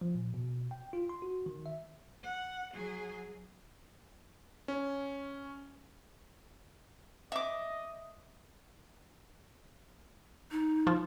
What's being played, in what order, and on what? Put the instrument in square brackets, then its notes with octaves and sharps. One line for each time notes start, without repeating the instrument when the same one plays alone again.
[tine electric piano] F3
A#2
B2
G5
F4
C6
F#4
D#3
E5
[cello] F#5
F#3 G#4
[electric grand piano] C#4
[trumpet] D#5 [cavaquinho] E5 D6
[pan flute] D#4
[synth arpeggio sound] F3